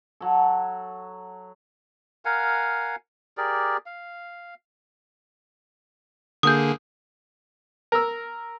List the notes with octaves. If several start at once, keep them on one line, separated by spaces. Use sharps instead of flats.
F#3 A4
A#4 F5 F#5 G#5
G4 G#4 A#4 D5
F5
D3 A#3 G#4 D#6 G6
A#4 E6